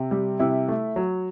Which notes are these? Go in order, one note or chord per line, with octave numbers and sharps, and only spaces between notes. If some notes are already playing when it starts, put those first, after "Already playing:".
Already playing: C3
G3
C3 E4
A3
F#3